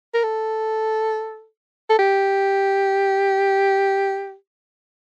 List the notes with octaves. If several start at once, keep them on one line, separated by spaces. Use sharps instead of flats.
A#4
A4
A4
G4